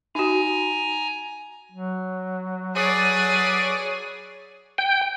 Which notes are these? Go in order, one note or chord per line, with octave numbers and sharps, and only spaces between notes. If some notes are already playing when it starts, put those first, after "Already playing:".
D#4 F#4 G#5 A#5
F#3
G#4 A4 B4 C#5 D5
G5